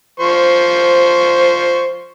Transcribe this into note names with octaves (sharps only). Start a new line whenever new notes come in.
F3 C5 C#6